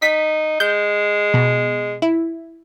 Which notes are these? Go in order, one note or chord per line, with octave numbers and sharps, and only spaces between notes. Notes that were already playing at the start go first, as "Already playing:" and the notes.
D#4 B6
G#3 G6
B2
E4